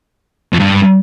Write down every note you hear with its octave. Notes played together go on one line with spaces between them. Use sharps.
F2
G2